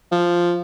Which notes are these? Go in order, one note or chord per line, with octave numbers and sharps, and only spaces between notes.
F3